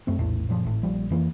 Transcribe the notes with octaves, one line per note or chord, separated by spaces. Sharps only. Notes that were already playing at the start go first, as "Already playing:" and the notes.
F#2 A3 C4
A#1 E2 A2
F#2 A#2 D#3 F3
G#1 A2
A#1 F3 G3
F2 E3 A#3